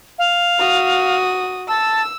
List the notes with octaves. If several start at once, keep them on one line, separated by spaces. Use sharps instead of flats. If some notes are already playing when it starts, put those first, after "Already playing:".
F5
F#4 D#6
A5 E6